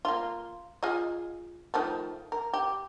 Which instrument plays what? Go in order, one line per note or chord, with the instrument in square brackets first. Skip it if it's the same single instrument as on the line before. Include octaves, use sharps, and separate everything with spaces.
[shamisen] A#3 F4
F4 G#4 D#5
D#3 F3 A3
A#4
G4